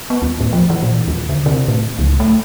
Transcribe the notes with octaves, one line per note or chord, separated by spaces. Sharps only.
B3
D#2
A2
F3
E3
A#2
D#2
D3
C3
A2
C#2
A3